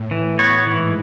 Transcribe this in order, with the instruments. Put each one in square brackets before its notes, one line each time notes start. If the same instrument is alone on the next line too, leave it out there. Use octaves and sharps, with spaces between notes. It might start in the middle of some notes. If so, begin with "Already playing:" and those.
Already playing: [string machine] A2
[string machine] A2 [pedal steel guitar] E3
[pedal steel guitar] B3 F#4 C#5
[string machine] G#2 [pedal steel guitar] E3